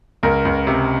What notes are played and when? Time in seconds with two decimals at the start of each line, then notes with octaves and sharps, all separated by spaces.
0.23 C#2 A#4
0.45 C#2
0.67 C3